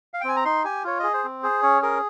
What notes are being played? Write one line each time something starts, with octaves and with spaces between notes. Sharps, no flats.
F5
G5
C4 G#5
A#5
D#4 C6
G4 G#5
F4 C#5
G#4 D#5
C5
C4
G#4 C5
C#4 C#5
G#4 A#4